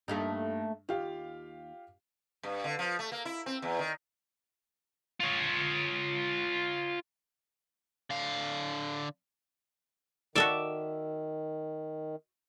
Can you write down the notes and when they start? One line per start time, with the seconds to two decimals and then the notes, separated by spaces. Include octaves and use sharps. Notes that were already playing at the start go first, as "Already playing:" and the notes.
0.08 G2 A3 A#3 D#4
0.89 D#2 F4 G4 F5
2.43 G2
2.64 D3
2.79 F3
2.99 A3
3.12 A#3
3.25 E4
3.46 C4
3.62 E2
3.79 D#3
5.20 F4 C#5
8.10 D3 F5
10.35 D#3 F#4 A4 D5 E5 D6